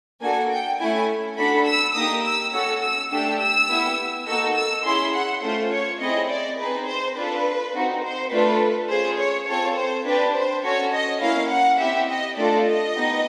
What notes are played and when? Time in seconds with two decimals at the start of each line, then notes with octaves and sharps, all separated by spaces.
0.21 A#3 D4 F#4 A4 G#5
0.50 G5
0.79 A3 C#4 E4 G#5
1.37 D4 F#4 A4 B5
1.66 E6
1.94 A#3 D#4 G4 D#6
2.24 E6
2.52 C#4 F#4 A4 E6
2.81 E6
3.11 A3 D4 G4 E6
3.39 E6
3.68 B3 E4 G4
4.26 A#3 D#4 F#4 A4 E6
4.55 E6
4.85 C#4 E4 G#4 C6
5.14 F#5
5.42 A3 C#4 F4 C5
5.72 C#5
6.00 C4 E4 G#4 D#5
6.28 D5
6.58 C4 D#4 G#4 B4
6.86 C5
7.16 D4 F4 A4 B4
7.74 C4 D#4 F#4
8.03 C5
8.31 A3 D4 F4 A4 B4
8.89 C#4 F4 G#4 C5
9.18 C#5
9.47 C4 F4 A4 C#5
9.76 C5
10.05 D4 G4 B4
10.34 C5
10.63 C#4 F#4 A4 C#5
10.93 D#5
11.20 A#3 C#4 E4 F5
11.50 F#5
11.78 C4 E4 G4 E5
12.08 D#5
12.36 A3 D4 F4 A4 D5
12.65 D#5
12.94 B3 D#4 G4